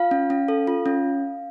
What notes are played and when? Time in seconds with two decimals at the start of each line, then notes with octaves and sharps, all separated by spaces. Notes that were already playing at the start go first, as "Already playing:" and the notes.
Already playing: F4 F5
0.11 C#4
0.30 C#4
0.48 A4
0.67 F4
0.86 C#4